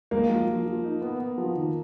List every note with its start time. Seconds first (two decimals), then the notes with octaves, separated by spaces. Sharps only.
0.11 G#3 A#3
0.29 F3
0.47 F3
0.66 F3
0.84 D#4
1.02 B3
1.19 B3
1.38 F3
1.55 D#3